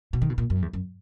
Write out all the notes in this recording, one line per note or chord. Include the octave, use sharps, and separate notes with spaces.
B2
D#3
B2
A#2
F#2
E2
F#2